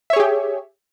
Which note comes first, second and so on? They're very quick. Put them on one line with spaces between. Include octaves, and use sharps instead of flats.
E5 C#5 G#4 G4